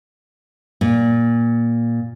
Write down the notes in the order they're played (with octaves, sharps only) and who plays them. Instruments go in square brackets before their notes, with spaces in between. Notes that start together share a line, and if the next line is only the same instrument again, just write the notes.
[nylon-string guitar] A#2